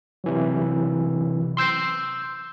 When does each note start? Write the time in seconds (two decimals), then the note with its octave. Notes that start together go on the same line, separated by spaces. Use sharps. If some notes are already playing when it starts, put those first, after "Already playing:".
0.24 C3 E3 F#3
1.57 C6 E6 G6 C7